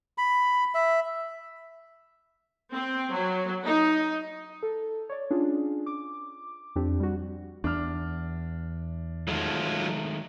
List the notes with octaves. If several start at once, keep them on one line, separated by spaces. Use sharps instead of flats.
B5
E5
C4
F#3
D#4
A4
C#5 D5
C#4 D4 F4 G#4
D6
F2 C4 D4 G4
G3 F#4
E2 D4 F6
D#3 F#3 G#3 A3 F4